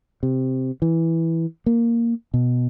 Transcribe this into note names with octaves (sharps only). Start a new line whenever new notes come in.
C3
E3
A#3
B2